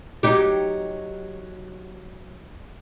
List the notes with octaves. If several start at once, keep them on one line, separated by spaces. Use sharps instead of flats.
F#3 D#4 G4